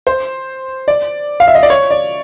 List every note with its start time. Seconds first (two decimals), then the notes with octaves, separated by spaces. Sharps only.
0.07 C5
0.88 D5
1.40 F5
1.48 E5
1.55 D#5
1.63 D5
1.70 C#5
1.91 D5